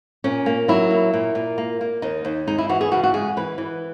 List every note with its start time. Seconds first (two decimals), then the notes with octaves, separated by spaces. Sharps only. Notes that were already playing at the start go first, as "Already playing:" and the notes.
0.24 A#2 C#4
0.46 A#3
0.68 F#3 E4
0.91 A#3
1.13 A#2
1.35 A#2
1.58 A#3
1.81 A#3
2.02 D#2 D#4
2.25 D#2
2.47 G#3 D#4
2.58 E4
2.69 E3 F#4
2.81 G#4
2.92 C#3 F#4
3.04 F#4
3.14 G#3 G#4
3.37 E3 B4
3.58 E3